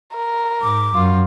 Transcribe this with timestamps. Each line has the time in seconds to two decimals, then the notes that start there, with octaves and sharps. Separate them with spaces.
0.14 A#4
0.62 G#2 D6
0.95 F#2 F4